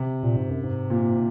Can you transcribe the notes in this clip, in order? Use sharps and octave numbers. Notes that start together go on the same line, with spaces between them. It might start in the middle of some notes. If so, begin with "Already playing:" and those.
Already playing: C3
A#2
G#2
F#2
G#2
A#2